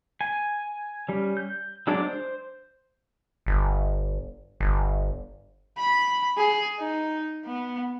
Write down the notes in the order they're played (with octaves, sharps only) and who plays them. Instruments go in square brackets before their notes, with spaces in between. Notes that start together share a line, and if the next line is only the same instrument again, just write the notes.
[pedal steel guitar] G#5
G3 C#4
G6
F#3 G#3 D4 D5
C5
[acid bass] G1
G1
[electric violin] B5
G#4
D#4
B3